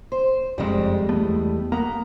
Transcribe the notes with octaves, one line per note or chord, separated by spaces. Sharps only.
C5
F#1 F2 G3 G#3
E2 A3 B3
A#3 B3 A#5